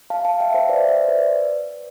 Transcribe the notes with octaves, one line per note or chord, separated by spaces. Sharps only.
F5 A5
F5 A5
E5 G5
C5 E5
B4 D5
C5 E5
B4 D5